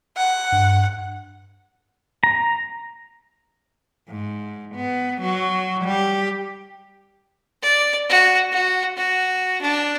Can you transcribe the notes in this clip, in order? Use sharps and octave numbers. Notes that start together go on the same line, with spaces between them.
F#5
G2
A#5
G#2
B3
F#3 F#4
G3 G4
D5
F#4
F#4
F#4
D4